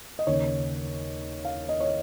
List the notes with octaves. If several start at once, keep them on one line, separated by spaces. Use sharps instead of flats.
D#5
D#2 C#3 C#5
F5
D#5
C#5